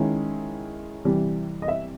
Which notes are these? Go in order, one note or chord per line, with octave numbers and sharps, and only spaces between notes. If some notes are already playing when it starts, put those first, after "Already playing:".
Already playing: D#3 G#3 C#4 E4
C3 E3 G3
D#5
E5